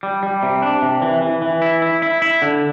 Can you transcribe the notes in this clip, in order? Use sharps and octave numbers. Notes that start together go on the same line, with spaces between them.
G3
G3
C3
D4
C3
E3
E3
E3
E4
E4
E4
E4
D3